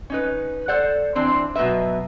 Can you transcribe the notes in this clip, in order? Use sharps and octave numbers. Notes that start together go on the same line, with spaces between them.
C#4 D#4 B4
A4 C5 D5 F#5
E3 C4 D4 C5
B2 F#3 G#3 B4 E5